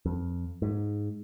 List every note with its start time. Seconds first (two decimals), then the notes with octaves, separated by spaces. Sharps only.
0.06 F2
0.62 G#2